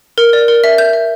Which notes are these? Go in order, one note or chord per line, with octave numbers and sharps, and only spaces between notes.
A#4
D5
A#4
E5
G6
E5